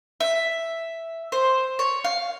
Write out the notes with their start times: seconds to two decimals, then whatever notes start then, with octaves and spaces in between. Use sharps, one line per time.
0.20 E5
1.32 C5
1.79 C#5
2.04 F5